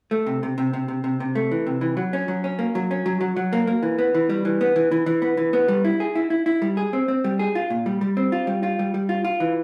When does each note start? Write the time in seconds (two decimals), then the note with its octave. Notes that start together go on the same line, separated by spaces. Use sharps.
0.11 A3
0.26 C3
0.43 C3
0.58 C3
0.73 C3
0.88 C3
1.04 C3
1.20 C3
1.35 A3
1.51 E3
1.67 C3
1.81 E3
1.97 F#3
2.13 C#4
2.28 F#3
2.44 C#4
2.59 A#3
2.75 F#3
2.91 C#4
3.06 F#3
3.21 F#3
3.36 F#3
3.53 A#3
3.67 A#3
3.83 E3
3.99 B3
4.15 E3
4.29 G3
4.45 E3
4.61 B3
4.76 E3
4.91 E3
5.06 E3
5.22 B3
5.37 E3
5.53 B3
5.68 G3
5.85 E4
6.00 G#4
6.15 E4
6.30 E4
6.46 E4
6.62 G3
6.77 G#4
6.93 C4
7.08 C4
7.24 G3
7.39 G#4
7.55 F4
7.70 A#2
7.86 G3
8.01 G3
8.17 C4
8.32 F4
8.47 G3
8.63 F4
8.79 G3
8.94 G3
9.09 F4
9.24 F4
9.40 E3